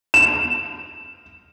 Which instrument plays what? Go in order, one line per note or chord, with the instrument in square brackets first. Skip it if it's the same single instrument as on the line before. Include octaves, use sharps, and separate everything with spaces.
[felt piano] E7